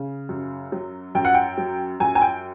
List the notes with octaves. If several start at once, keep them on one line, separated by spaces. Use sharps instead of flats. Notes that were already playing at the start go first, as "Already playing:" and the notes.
Already playing: C#3
F#2
F#3
F#2 G5
F#5
G5
F#3
F#2 G#5
G#5
G5